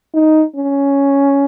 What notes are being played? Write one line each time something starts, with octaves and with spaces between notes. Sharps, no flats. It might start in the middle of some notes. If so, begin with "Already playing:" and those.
D#4
C#4